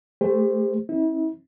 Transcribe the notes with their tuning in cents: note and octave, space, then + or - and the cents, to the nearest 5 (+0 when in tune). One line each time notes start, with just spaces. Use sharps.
A3 +0 G4 +40 C5 -15
C4 +45 E4 -40